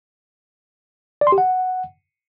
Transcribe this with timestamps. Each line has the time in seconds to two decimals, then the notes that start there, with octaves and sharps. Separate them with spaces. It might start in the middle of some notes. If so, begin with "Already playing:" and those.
1.21 D5
1.27 C6
1.32 G4
1.38 F#5